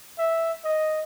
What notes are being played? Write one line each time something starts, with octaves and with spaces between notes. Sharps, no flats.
E5
D#5